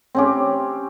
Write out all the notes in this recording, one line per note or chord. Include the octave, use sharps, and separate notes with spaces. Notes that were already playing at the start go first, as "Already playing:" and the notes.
C4 C#4 G4